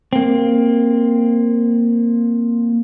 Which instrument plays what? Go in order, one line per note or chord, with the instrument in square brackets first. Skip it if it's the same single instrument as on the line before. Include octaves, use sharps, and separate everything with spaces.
[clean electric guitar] A#3 C4